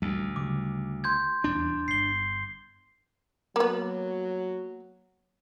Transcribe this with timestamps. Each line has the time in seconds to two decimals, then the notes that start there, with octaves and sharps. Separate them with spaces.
0.02 A1 D2 G3
0.36 C#3 F#3 G3 D6
1.04 C6 G6 G#6
1.44 D#1 E2 D4
1.88 G1 C7 G7
3.56 F#3 A#3 B3